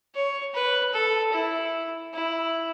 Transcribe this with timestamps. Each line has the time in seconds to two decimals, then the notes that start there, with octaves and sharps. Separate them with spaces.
0.15 C#5
0.55 B4
0.94 A4
1.33 E4
2.14 E4